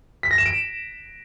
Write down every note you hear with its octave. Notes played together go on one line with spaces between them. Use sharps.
B6
A#6
E7
D7